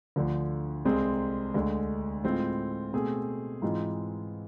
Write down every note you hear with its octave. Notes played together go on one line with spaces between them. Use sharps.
D2 D3 F3
C2 C3 G#3 C4 G#4
D2 D3 G#3
A2 G#3 C4 F4
B2 A3 C4 G#4
G#2 E3 G#3 C4 F4